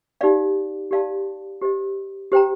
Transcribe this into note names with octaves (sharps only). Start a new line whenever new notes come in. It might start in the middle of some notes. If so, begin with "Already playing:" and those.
D#4 G4 D5 F5
G4 D5 F5 A5 C6
G4 C5 D#5
G4 C5 G5 A#5